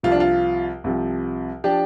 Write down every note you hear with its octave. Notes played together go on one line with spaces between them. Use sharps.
C2 C3 F3 F4
D4
F4
C2 C3 F3
F3 D4 G4